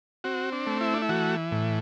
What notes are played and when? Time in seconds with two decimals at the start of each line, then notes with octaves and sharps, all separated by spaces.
0.24 C4 F#4
0.52 D4
0.67 A3
0.81 E4
0.94 D4
1.02 E4
1.09 E3 F#4
1.52 A2